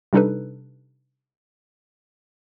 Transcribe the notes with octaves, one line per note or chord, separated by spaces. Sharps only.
C3 G3 D4 D#4 A4 B4